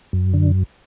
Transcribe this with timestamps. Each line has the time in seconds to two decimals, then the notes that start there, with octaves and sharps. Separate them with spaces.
0.13 F#2
0.34 D3